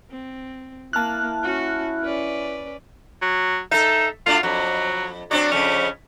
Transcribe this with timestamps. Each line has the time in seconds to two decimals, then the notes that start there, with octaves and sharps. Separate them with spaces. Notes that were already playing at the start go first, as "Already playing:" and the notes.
0.10 C4
0.93 A#3 E4 A5 F6 F#6
1.43 C#4 F#4
2.03 C#4 B4 D5
3.22 F#3
3.71 D#4 A4 E5
4.26 A3 D4 F4 F#4
4.43 F2 F#3
5.31 F#3 C4 D4 D5
5.52 F2 C#3 C#4